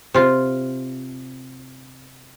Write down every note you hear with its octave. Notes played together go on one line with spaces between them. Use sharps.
C3 F4